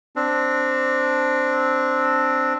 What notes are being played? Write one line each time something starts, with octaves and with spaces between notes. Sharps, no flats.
C4 D4